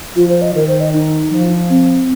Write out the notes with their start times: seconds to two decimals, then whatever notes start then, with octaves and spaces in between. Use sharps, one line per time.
0.16 F3 F4
0.29 C5
0.42 D#5
0.54 D#3 A#4
0.68 C5
0.80 D#5
0.94 D#4
1.32 F3
1.70 C4